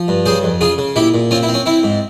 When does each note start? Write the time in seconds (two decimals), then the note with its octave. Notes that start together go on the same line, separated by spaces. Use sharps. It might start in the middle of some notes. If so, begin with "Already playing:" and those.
Already playing: F3
0.08 G2
0.26 C#3 G#4 C5
0.43 F2
0.61 C#3 F4 G#4
0.78 C#3
0.96 A#2 E4 G4
1.14 A#2
1.31 C4 C#4 F4
1.43 E4
1.48 C4
1.54 C#4
1.66 C4 E4
1.83 G#2